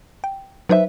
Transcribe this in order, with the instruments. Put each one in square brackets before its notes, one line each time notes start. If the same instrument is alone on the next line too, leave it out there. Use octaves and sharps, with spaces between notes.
[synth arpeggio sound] G5
[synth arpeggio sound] F#3 D#4 C5 [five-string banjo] B4 E5